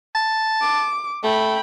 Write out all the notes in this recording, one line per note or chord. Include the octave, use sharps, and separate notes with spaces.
A5
D6
A3 G5 B5